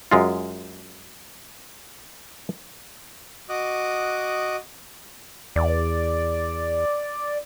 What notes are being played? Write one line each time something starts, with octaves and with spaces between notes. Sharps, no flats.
F#2 G#3 F4
F#4 D#5 D6 D#6 F#6
E2 D5